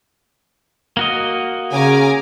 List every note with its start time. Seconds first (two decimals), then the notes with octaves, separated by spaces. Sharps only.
0.97 A#3 F#4 D#5
1.72 C#3 G#5 A#5 D6